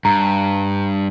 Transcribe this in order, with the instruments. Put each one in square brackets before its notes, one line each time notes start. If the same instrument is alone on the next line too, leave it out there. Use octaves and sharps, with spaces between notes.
[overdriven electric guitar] G2 [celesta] A#5